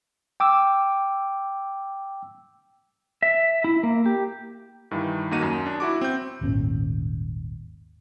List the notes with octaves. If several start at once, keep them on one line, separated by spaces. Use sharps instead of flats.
G5 D6 E6
E5
E4
A#3
G4
G2 D#3 E3
D#2 A#3 D#4 F#4 D#7
F#2
D4
E4 F#4 D6
C4 G6
D#1 G#1 A#2 C#4